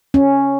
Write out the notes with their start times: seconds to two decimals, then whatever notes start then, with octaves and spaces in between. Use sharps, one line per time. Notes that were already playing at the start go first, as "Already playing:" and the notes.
0.14 C#4